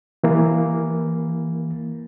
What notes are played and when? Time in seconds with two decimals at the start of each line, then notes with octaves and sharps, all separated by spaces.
0.24 E3 A#3